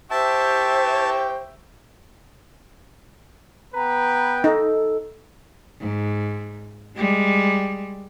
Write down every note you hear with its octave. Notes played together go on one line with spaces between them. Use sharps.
G4 C5 E5 G5 A5 C#6
B3 B4 G5 A#5
D#4 A4
G#2
G3 G#3